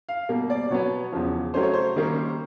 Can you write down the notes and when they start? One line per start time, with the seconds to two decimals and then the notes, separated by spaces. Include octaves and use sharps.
0.09 F5
0.29 B2 G3 A#3
0.50 D5
0.70 B2 F#3 B3 C#5
1.12 E2 C#3 F3
1.54 C#3 F#3 A3 C#4 C5
1.63 C#5
1.73 C5
1.96 D#3 G3 A#3 C#4